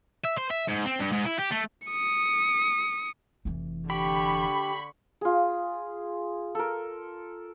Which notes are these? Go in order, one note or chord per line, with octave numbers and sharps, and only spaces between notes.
E5
C5
E5
G#2
C4
G2
G#2
E4
G4
A3
D#6 C#7
F1 E3
D3 G4 B5 C#6
F4 G#4
A4 A#4